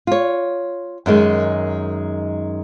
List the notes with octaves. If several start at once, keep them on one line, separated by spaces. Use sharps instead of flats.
F4 C#5
F#2 D#3 G#3